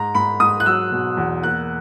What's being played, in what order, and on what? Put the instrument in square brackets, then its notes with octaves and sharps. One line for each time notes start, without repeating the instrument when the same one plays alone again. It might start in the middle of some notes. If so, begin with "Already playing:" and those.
Already playing: [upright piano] G#2 A#5
G#2 B5
G#2 D#6
F#6
F#3 E6
B2
E2
A#3 F#6